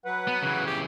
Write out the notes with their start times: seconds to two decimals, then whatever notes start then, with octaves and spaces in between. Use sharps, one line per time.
0.05 F#3 B4 F#5
0.27 B3
0.42 C#3 E3
0.66 G4